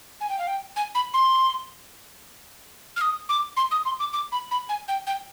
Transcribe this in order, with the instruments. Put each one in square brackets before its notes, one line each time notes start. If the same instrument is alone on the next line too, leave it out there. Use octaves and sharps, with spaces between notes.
[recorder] G#5
G5
F5
G5
G#5
B5
C6
F6
D#6
D6
C6
D#6
C6
D6
D6
B5
B5
G#5
G5
G5